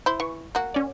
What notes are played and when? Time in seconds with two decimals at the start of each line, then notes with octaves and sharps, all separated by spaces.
0.06 E4 C5
0.20 E3 C#6
0.55 A#3 F#4
0.74 C#4 D5